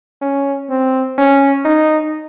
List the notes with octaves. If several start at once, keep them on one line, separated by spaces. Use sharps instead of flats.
C#4
C4
C#4
D#4